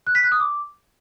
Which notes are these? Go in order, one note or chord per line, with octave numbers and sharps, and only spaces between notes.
F#6
B6
F#6
D#6
D6